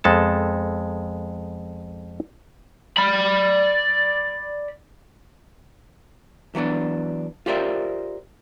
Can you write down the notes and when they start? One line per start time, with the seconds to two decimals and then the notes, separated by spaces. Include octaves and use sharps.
0.04 F2 G#3 B3 A4 A5
2.97 D5 B5
6.55 E3 F#3 B3 D4
7.46 F4 G4 A#4 C5 D5 E5